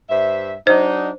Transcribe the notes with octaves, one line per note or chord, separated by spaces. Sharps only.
G2 C5 E5
F#3 D4 D#4 C5